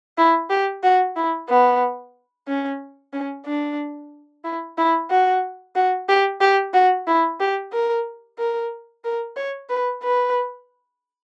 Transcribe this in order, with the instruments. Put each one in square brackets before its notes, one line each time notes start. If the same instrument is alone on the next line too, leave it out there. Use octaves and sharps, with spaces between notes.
[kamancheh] E4
G4
F#4
E4
B3
C#4
C#4
D4
E4
E4
F#4
F#4
G4
G4
F#4
E4
G4
A#4
A#4
A#4
C#5
B4
B4